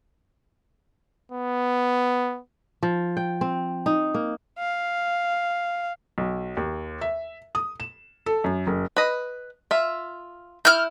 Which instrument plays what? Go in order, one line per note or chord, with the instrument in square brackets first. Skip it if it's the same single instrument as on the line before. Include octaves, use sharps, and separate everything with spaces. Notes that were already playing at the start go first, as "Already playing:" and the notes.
[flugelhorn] B3
[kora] F3
G5
C4
D#4
A#3
[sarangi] F5
[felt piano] B1
D#2
E5
D#6
E7
A4
F#2
F#1
[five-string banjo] B4 D#5
F4 E5
[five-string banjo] E4 [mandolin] F6 G6